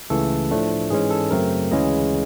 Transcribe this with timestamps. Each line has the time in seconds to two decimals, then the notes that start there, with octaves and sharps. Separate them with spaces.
0.10 C#2 C#3 E3 A3 A4
0.51 A2 F3 A3 D4
0.90 G#2 E3 G#3 C#4 G#4
1.10 A4
1.31 F#2 C#3 F#3 A3 C4 A#4
1.71 D2 C#3 E3 G#3 C#4 D#5